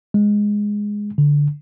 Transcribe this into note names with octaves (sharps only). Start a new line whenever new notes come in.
G#3
D3